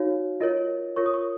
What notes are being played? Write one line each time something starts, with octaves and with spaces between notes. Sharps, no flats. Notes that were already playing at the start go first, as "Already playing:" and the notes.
Already playing: D#4 F#4 C#5 F5
F4 A#4 C#5 D#5
F4 A#4 C#5 C#6
D#6
C#6